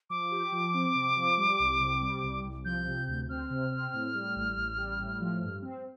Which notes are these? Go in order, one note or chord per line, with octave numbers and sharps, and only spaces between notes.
F3 D6
G4
F3
C4
C3
F3
G3
C2
C3
G3
C2
C2
F3 G6
C3
D2
C4 F6
C3
C4
A2
G3
A1
A1
G3
A2
F3
G2
C4